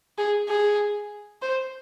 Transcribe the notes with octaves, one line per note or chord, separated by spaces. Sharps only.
G#4
G#4
C5